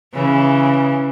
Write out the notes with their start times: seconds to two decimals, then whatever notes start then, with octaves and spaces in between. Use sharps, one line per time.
0.14 C#3 E3